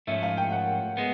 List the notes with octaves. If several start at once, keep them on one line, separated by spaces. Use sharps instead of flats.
G#2 F3 A3 C#4 E5
F5
G5
F#5
G#3 B3